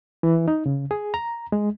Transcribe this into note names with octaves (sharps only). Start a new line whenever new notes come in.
E3
D#4
C#3
G#4
A#5
G#3